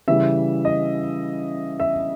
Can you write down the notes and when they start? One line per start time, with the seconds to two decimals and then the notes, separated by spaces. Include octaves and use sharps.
0.08 C#3 E3 G3 E5
0.65 D#5
1.80 E5